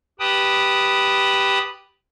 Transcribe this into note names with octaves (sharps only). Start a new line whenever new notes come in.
G4 B4 G5 A5 B5 D#6